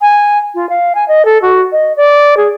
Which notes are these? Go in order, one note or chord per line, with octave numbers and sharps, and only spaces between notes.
G#5
F4
F5
G#5
D#5
A4
F#4
D#5
D5
G#4